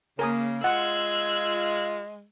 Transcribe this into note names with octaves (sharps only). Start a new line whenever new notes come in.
C#3 A#3 A#4 G#5 D#6
G#3 F4 F#5 E6 F#6 G#6